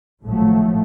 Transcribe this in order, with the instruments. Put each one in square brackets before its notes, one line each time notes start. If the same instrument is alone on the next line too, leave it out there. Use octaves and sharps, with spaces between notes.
[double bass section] G#1 A2 F3 F#3 A3